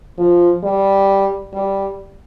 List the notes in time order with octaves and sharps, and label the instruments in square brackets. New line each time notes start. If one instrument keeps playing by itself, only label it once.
[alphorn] F3
G3
G3